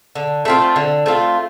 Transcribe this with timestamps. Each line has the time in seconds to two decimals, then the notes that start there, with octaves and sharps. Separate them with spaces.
0.15 D3
0.45 A3 C4 F4
0.76 D3
1.06 A3 C4 F4